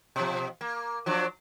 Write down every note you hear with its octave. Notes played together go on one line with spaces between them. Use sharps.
B2 F3
A#3
F3 F#3 D4